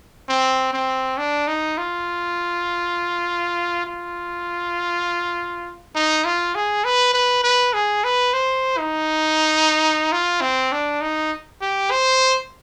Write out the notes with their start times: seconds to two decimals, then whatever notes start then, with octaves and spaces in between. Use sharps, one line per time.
0.29 C4
0.73 C4
1.18 D4
1.48 D#4
1.78 F4
3.86 F4
5.95 D#4
6.25 F4
6.55 G#4
6.84 B4
7.14 B4
7.44 B4
7.74 G#4
8.04 B4
8.33 C5
8.78 D#4
10.12 F4
10.41 C4
10.72 D4
11.01 D#4
11.61 G4
11.91 C5